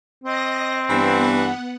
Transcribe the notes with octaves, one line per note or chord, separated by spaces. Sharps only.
C4 D#5 A#6
G2 E3 B3 F#5